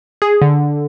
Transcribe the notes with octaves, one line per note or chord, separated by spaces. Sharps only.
G#4
D3